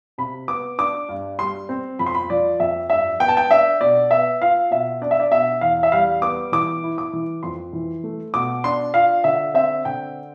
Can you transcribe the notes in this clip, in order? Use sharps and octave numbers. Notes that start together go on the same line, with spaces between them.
C3 B5
B3 D6
D4 D6
G2
G3 C6
C4
F2 B5
C6
B5
F3 D5
F2 E5
G2 E5
B3 G5
A5
G5
D4 E5
B2 D5
B3 E5
F4 F5
B2 E5
D4 D5
E5
D5
B2 E5
E2 F5
E5
G3 F5
B3 D6
E3 D6
E4
D6
E3
F2 C6
E3
A3
B2 D6
D4 C6
F4 F5
D3 E5
C4 E5
D3 G5